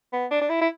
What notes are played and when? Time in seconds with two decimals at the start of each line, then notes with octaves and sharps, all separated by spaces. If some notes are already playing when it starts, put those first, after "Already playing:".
0.13 B3
0.31 D4
0.41 D4
0.49 E4
0.61 E4